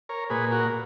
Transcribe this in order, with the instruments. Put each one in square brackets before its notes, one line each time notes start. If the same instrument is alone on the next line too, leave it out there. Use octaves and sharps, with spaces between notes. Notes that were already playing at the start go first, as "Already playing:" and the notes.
[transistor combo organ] A#4 C#5
A#2 G#4 B4
F#4 A#4